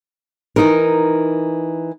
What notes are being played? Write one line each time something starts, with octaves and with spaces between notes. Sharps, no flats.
E3 D#4 A#4